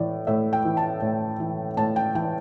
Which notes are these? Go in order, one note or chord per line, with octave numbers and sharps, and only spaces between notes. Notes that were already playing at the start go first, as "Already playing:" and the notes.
Already playing: A2 E3 D5
A2 E5
G5
E3
A5
A2
E3
A2 A5
G5
E3 G5